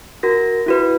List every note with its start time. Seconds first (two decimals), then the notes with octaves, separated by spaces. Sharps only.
0.23 F#4 A#4 A#6
0.66 E4 F#4 B4